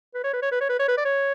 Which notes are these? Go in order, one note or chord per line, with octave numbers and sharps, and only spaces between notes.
B4
C#5
B4
C#5
B4
C#5
B4
C#5
B4
D5
C#5